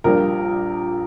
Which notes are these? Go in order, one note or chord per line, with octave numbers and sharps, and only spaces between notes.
A#1 A#2 G3 A#4